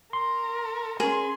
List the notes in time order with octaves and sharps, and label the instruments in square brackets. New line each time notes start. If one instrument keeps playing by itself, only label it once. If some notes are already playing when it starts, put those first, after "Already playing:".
[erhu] A#4 [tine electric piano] C6
[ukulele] C#4 A#4 [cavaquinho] G#4 [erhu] C6